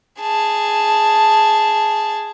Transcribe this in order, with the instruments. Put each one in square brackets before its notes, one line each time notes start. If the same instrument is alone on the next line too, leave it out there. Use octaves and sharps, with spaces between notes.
[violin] G#4 A5